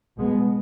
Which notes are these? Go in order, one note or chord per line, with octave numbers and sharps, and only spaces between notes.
B2 G#3 B3